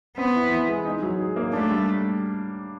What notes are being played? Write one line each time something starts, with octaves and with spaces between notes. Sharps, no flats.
B3 C4
E3
E3
G#3
D#4
F#3
G#4
A#3
A3 D4
G3